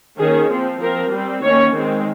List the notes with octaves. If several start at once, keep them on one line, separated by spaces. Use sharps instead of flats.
D#3 A#3 C#4 G#4
F3 C4
F3 C4 A#4
G3 C4
D#3 A#3 C#4 C#5
D#3 G#3 C4